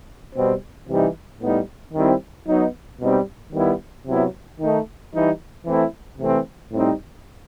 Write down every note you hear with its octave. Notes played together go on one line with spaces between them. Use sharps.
B2 G3 C4
C3 E3 G3 D#4
A2 G3 B3 D#4
D#3 G3 C4 E4
F#3 B3 D#4
B2 G3 C4 D#4
D#3 G3 B3 E4
C3 F#3 B3 E4
D#3 A3 D#4
E3 G3 D#4
E3 A3 C4 E4
C3 E3 A3 C4
A2 G3 C4 D#4